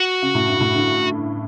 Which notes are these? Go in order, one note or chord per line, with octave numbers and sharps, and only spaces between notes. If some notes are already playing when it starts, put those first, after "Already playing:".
Already playing: F#4
C#3
A2
G2
A2
D3